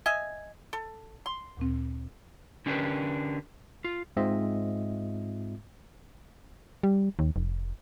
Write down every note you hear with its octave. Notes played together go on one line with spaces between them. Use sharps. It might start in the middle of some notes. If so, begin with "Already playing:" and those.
D#5 E5 G#5
A4
C6
D2 A#2 C4
D3 C#4 D4 G4 A#4 B4
F4
G#2 G#3 C4 F4 D#5 E5
G3
D#2
F1